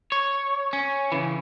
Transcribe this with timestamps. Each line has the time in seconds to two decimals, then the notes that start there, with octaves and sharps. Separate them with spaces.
0.12 C#5
0.73 C#4
1.12 C#3 E3